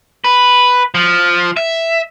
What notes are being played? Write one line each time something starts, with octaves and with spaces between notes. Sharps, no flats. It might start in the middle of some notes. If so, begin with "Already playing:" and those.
B4
F3
E5